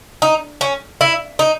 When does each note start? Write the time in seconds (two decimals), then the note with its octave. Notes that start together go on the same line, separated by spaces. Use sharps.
0.22 D#4
0.61 C#4
1.01 E4
1.39 D#4